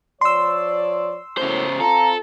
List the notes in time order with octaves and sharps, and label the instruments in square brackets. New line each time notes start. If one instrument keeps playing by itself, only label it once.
[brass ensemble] F3 C#5 D5 [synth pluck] C6 E6
[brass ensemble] F#2 A2 [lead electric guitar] C#3 C5
[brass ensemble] C4 F4 [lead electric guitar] A4 [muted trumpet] A#5